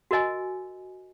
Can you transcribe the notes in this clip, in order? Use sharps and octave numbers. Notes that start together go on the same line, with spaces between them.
F#4 A#4 D#5 G#5